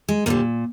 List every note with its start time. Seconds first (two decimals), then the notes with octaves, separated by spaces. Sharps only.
0.09 G#3
0.26 D2 A#2 D3 G3 A#3